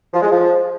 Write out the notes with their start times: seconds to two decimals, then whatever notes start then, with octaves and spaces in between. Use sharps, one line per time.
0.13 F3
0.22 G#3
0.30 F3